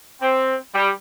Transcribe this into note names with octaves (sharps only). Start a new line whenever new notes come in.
C4
G3